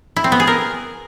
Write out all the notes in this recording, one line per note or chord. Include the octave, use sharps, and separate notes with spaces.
E4
C4
B3
G#4
A#4